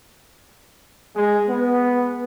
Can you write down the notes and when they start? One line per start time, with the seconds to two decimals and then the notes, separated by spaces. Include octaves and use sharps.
1.16 G#3
1.49 B3